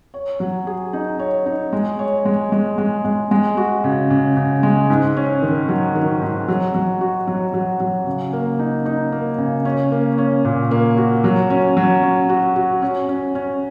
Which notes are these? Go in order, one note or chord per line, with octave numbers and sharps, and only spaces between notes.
C#5
F#3
G#4
D#4
C#5
D#4
G#3
C#5
G#3
G#3
G#3
G#3
G#3
F#4
C#3
C#3
C#3
G#3
G#2
C#4
D#3
F#3
D#3
G#2
F#3
F#3
F#4
F#3
F#3
F#3
C#3
A#3
D#4
D#4
A#3
C#3
C#4
A#3
C#4
A#2
A#3
F#4
F#3
C#4
F#3
C#4
F#4
F#4
C#4
C#4
C#4